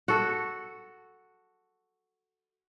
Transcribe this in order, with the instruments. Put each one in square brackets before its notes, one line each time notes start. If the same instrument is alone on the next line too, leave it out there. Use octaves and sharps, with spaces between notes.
[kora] F#4 A4